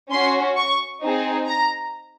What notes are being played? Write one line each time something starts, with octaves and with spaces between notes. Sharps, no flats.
C#4 F#4 C6
C#6
C4 D#4 G#4
A#5